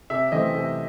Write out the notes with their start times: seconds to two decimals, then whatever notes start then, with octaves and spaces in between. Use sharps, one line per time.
0.10 C3 E5
0.32 E3 A3 C4 D#5
0.55 C3